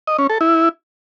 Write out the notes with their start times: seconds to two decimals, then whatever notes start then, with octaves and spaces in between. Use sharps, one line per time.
0.07 D#5
0.18 C#4
0.30 A4
0.41 E4